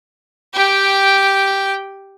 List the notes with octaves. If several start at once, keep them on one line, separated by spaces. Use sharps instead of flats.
G4 G5